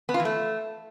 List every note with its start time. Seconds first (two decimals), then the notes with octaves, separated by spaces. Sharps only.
0.09 B3
0.14 F4
0.20 E3
0.25 A3